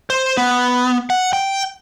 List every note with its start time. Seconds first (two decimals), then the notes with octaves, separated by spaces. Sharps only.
0.10 C5
0.37 B3
1.10 F#5
1.33 G5